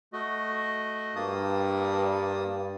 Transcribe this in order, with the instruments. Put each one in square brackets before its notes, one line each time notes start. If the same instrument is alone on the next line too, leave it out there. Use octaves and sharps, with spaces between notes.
[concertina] A3 F#4 D#5
[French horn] G2 [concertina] A#3 A5 D#6